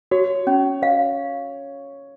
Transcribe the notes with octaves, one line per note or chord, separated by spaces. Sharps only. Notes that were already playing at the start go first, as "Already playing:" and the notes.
F#4 C#5
C#4
C#5 F5